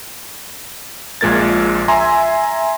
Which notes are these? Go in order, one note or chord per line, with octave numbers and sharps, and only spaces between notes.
A#1 A#2 G#3 A#4 G#6 A6
E5 G#5 A#5 C6